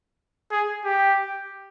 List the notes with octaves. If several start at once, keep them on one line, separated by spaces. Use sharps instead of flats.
G#4
G4